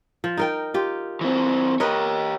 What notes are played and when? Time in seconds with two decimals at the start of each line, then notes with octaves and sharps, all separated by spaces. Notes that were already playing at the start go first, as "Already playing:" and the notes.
0.24 F3
0.37 D#4 A#4 G5
0.74 F4 G4
1.21 E3 C4
1.80 G4 A#4 B4 C#5 D#5